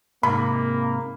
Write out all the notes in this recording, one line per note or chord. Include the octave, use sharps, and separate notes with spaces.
G#2 C3 A#3 B5